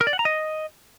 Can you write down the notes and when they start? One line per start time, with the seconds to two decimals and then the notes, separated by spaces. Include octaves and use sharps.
0.01 A#4
0.07 D5
0.13 F#5
0.19 A#5
0.25 D#5